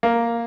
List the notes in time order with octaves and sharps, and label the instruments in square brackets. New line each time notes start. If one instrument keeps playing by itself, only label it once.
[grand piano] A#3